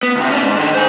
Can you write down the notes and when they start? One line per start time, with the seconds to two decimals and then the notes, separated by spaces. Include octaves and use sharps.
0.03 B3
0.16 D2 C3
0.30 C#4 D4
0.43 G#2
0.57 D#3 D4
0.75 C5 G#5